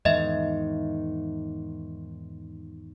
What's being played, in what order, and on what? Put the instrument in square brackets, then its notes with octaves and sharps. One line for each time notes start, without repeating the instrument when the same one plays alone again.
[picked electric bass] E2 G#2 D#3 [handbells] D#5 E5